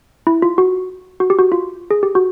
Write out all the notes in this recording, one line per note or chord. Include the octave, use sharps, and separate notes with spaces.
E4
F4
F#4
F#4
G4
F#4
F4
G#4
G4
F#4